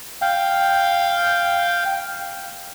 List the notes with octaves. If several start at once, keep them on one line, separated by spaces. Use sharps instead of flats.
F5 G5